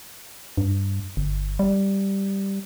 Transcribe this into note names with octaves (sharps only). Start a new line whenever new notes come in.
G2
G1
G3